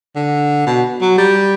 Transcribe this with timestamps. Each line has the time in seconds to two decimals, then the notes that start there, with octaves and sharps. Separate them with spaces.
0.16 D3
0.66 B2
1.01 F#3
1.18 G3